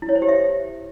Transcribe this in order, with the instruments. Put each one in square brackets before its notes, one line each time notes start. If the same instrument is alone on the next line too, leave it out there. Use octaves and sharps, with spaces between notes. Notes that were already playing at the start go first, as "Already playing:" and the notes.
[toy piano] E4
C#5
C5
G4
E5